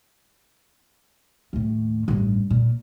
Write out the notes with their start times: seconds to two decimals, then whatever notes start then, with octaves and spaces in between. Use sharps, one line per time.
1.53 D#2 A2
2.08 A1 G2
2.50 A#2